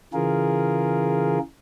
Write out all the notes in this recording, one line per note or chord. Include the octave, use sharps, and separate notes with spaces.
C#3 E3 F4 G#4 A#4